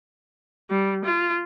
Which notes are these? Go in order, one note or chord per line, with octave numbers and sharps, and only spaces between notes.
G3
F4